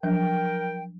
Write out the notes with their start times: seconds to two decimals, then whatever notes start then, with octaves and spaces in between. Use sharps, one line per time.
0.03 F3 F#3 D4 A#4 G5